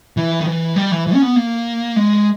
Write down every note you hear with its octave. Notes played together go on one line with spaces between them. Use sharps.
E3
D#3
E3
G3
E3
E3
C#4
B3
A#3
G#3